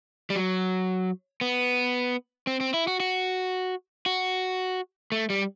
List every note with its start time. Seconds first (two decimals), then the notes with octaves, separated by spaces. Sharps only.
0.30 G3
0.36 F#3
1.41 B3
2.47 C4
2.60 C4
2.74 E4
2.87 F#4
3.00 F#4
4.06 F#4
5.12 A3
5.30 G3